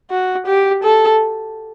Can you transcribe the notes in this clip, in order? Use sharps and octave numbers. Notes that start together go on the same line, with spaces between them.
F#4
G4
A4